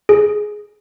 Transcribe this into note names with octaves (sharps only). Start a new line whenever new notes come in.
G#4